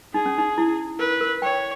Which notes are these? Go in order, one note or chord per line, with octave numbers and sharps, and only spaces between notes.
D#4 G#4
C#4
D#4
E4
A#4 B4
A#4
C#5 G5